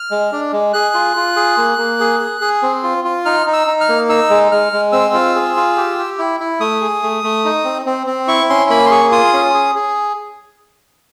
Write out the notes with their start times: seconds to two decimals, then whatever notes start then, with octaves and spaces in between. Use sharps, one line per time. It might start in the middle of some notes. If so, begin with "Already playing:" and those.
Already playing: F6
0.11 G#3
0.32 D4
0.52 G#3
0.73 G#4 F#6
0.94 F4
1.16 F4
1.36 G#4
1.57 A#3
1.78 A#3
2.00 G#4
2.20 G#4
2.41 G#4
2.63 C4
2.84 F4
3.05 F4
3.25 D#4 F6
3.47 D#4
3.53 E6
3.67 D#4
3.81 F6
3.89 A#3
4.09 D#4 E6
4.30 G#3
4.52 G#3 F6
4.73 G#3
4.92 C4 E6
5.14 F4
5.35 G#4
5.56 F4
5.77 G4
5.98 G4
6.18 E4
6.40 E4
6.60 A3 D#6
6.81 G#4
7.03 A3
7.24 A3
7.45 D#4
7.65 C4
7.86 C4
8.07 C4
8.28 E4 C#6
8.50 C#4 C6
8.70 A#3 B5
8.86 C6
8.90 G#4 C#6
9.11 F4 D#6
9.33 C#4
9.54 G#4
9.75 G#4